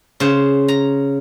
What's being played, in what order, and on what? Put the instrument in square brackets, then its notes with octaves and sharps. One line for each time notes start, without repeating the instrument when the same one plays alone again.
[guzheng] C#3 C5
A#5